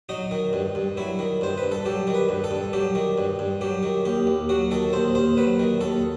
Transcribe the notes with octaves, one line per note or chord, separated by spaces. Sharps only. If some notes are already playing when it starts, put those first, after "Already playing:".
F#3 D#4
D#3
G2
G2
F#3 E4
D#3
G2 C5
B4
G2
A4
F#3 G4
D#3
B4
G2
A4
G2
F#3 G4
D#3
G2
G2
F#3 G4
D#3
D#2 G4
D#2
F#3 F#4
D#3 A4
D#2 C5
D#2 C5
F#3 B4
D#3
D#2 A4